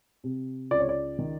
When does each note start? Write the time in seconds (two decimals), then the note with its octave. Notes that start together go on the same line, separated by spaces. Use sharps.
0.24 C3
0.71 C#2 D5
0.80 C#5
0.89 D5
1.19 D#3